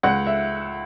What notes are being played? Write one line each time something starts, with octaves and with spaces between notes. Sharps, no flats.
C#2 F#5
E5